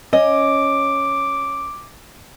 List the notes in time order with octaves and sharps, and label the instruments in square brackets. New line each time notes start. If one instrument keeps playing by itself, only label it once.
[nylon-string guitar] C#4 [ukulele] D#5 [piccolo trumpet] D6